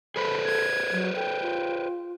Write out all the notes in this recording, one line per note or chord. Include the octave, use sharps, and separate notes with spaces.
G#4 A4 B4 C5 B5
G#6
F#3
A4 G5
F4